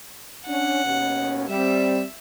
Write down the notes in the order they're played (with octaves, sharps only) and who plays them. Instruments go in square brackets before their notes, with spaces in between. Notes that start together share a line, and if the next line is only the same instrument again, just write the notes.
[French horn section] C#4 D4 [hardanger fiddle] F#5
[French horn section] D#2 B2 C#4
[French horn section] G3 [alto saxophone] C4 [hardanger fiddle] E5